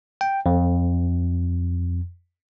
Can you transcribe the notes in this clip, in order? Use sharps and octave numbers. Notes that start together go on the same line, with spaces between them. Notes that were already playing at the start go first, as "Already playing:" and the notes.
G5
F2